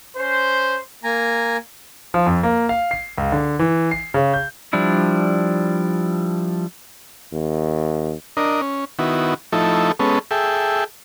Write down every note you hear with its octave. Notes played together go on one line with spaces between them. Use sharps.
C#4 C5
A#3 G#5 A#5
F3
F2
A#3
F5
C7
C#2
D3
E3
C7
C#3
G6
F3 G3 D4 E4
D#2
D4 A#4 D#5
C#4
D#3 B3 E4 F#4
F3 A3 D#4 E4 A4
G#3 B3 C#4 A4
G#4 A4 E5 G5